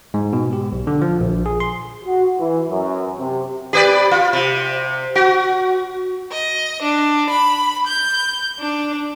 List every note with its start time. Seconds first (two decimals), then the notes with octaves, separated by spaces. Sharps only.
0.14 G#2
0.33 B2
0.53 G4
0.72 B1
0.87 D3
1.02 F3
1.21 A#1
1.46 G#4
1.60 C6
2.04 F#4
2.38 E3
2.69 F#2
3.18 C3
3.73 G4 B4 D5
4.11 F4
4.33 C3
5.16 F#4
6.33 D#5
6.82 D4
7.30 B5
7.85 G6
8.59 D4